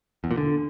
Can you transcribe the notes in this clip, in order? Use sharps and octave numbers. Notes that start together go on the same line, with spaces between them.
E2
A#2
D3